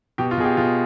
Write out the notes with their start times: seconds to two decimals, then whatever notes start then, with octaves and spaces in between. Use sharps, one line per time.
0.18 B2 G4
0.31 F4
0.38 B2 G#4
0.44 G4
0.57 B2 F4